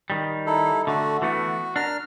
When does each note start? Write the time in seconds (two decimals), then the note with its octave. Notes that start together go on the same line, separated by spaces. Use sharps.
0.10 D#3 G3
0.46 D#4 E4 A4
0.87 D3 A3 F#4
1.22 E3 A3 B3 F#4
1.76 D4 A#4 F6